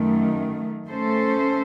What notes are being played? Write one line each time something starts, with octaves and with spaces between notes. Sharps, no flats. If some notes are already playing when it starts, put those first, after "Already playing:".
Already playing: F#2 D#3 A3
A3 C#4 A4 C5